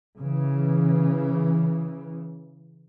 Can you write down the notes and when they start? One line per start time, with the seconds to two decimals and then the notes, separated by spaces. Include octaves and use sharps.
0.18 C#3 E3